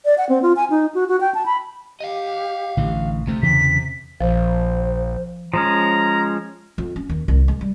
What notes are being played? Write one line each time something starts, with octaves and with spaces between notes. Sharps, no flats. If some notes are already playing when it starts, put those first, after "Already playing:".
D5
F#5
C4
F4
G#5
D#4
F#4
F#4
G5
A5
B5
G4 D#5 F5
A1 D3 E3
D2 C3 A3
E2 C#3 E3 B6
A#1 F3 C5
F3 G#3 C#4 A#5
F2
C#4
D#2
C2
G#3
G3